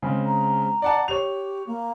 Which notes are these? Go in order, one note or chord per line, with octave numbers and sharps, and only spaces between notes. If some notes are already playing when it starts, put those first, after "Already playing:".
C#3 G#3 C4
A#5
D5 F#5 A5
G4 C#5 F7
A#3